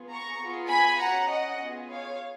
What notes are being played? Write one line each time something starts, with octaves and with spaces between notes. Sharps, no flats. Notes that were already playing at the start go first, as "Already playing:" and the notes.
Already playing: B3 F4 G#4
A#5 C#6
B3 F4 G#4
G#5 B5
C#4 F#4 F#5 A#5
D#5 F#5
B3 F4 G#4
C#5 F5